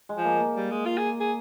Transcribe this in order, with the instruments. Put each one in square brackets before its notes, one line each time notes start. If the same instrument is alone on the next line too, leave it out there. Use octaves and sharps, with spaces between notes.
[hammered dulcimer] G#3
[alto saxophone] F3
[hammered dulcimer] A#3
A#3
[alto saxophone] G3
G#3
F4
G#4
G#4